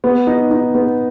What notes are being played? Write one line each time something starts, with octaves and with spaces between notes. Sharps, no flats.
B3
D#4
D#4
B3